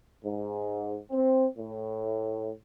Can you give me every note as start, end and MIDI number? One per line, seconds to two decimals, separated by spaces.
0.24 0.97 44
1.11 1.46 60
1.57 2.50 45